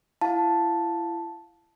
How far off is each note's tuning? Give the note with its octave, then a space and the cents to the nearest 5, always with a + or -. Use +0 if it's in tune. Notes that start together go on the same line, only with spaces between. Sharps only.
E4 +35 F5 +25 A5 +0